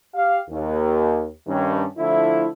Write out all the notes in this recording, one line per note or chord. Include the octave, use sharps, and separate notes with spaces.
G4 F5
D#2
G2 D#3 C#4
D3 F3 A3 E4